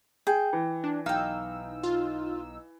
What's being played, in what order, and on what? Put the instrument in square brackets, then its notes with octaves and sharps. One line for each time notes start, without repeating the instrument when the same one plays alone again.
[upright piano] G#4 [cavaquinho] G5
[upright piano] E3
[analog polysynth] D4
[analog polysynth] B1 D#4 E6 [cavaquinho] F5 G5
[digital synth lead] F4